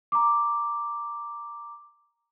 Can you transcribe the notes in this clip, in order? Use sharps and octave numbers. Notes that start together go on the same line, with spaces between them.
A#5 D6